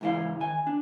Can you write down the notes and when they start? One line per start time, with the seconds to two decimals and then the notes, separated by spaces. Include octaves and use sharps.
0.01 C#2 G#2 E3 E4 F5
0.41 D#3 G#5
0.67 D4